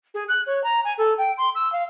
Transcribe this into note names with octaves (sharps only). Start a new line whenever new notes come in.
G#4
F#6
C#5
A#5
G#5
A4
G5
C6
E6
F5